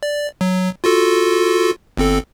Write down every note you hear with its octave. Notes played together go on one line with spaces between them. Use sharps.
D5
F#3
F4 F#4 A4
G1 C4 A4